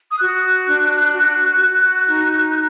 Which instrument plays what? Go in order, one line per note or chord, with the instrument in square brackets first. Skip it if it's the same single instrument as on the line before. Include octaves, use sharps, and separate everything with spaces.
[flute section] D#6
F#4 F#6
D4
F#4
F#4
D#4